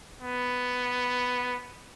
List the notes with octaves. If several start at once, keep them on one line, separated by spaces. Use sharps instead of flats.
B3